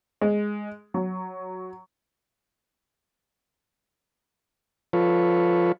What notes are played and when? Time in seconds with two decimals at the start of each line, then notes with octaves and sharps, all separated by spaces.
0.21 G#3
0.94 F#3
4.93 F3 F4 A4 B4 C#5